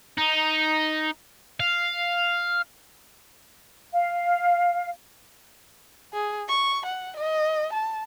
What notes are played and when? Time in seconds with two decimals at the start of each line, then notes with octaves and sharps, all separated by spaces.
0.18 D#4
1.60 F5
3.93 F5
6.13 G#4
6.49 C#6
6.86 F#5
7.17 D#5
7.73 A5